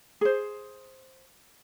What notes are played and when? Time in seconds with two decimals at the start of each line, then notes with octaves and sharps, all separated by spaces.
0.21 G#4 C5